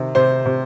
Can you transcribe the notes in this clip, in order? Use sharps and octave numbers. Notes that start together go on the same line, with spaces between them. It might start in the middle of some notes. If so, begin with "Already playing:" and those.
Already playing: C3 D#3
C3 C5
C3